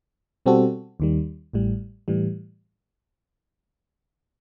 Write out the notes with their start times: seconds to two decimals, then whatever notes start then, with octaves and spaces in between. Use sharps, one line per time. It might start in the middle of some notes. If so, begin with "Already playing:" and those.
0.46 B2 G3 C4 F#4 A4
1.00 D#2 D#3 G3
1.53 A1 A2 G3
2.08 A2 E3 G3